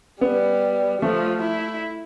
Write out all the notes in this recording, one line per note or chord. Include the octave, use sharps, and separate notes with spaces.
G3 B3
F3 A3
E4